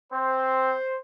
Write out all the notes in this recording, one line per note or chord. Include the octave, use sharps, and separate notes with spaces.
C4 C5